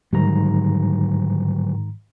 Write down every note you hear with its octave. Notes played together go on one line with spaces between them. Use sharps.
G#2 D3 D#3 F#3 G3 A#5